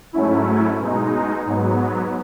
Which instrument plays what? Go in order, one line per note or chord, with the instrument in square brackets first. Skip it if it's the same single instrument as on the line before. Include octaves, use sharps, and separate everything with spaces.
[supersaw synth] G#2 F#3 A3 C#4 E4
B2 G#3 D#4
G#2 F#3 B3